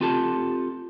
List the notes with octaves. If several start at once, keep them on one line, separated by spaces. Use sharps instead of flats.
C4 F4 G4 A4 A5